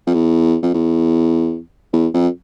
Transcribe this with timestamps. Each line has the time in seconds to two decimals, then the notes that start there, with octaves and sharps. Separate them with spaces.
0.07 F2
0.14 E2
0.63 F2
0.74 E2
1.93 E2
2.14 F2